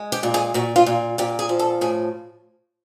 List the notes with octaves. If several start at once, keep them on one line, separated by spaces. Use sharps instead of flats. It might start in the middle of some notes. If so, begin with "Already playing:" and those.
Already playing: G#3
G4
A#2
G#4
A#2 F#4
F4
A#2
A#2 G4
G#4
F3
A4
A2 G#4